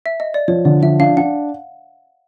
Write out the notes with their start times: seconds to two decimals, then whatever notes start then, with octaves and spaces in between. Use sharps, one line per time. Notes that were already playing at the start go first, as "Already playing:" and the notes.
0.06 E5
0.20 D#5
0.34 D5
0.48 F3 C#5
0.65 D3 D5
0.83 F3 E5
1.00 D4 F5
1.17 D4 F#5